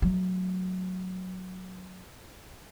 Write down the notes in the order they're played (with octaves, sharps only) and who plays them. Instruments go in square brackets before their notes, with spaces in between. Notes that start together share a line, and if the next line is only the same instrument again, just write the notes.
[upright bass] F#3 A3